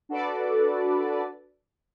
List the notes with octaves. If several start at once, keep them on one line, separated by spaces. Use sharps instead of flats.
D4 F#4 A4 B4 D5